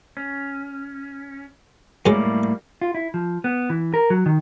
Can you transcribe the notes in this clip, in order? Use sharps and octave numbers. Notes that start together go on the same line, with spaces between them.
C#4
F#2 A2 G3 G#3 A#3
F4
E4
F3
B3
E3
A#4
F#3
D#3